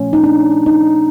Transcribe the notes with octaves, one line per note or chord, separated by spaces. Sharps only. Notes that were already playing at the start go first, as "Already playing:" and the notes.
Already playing: A#2 F3 A3 C#4
D#4
D4
D#4